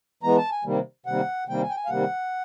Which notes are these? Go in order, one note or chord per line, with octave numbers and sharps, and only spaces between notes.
E3 G#3 B3 A#5
A5
G#5
C3 D#3 G3 A#3
C3 D#3 G3 A#3 F#5
C3 D#3 G3 A#3 G5
G#5
G5
G#5
F5
C3 D#3 G3 A#3 F#5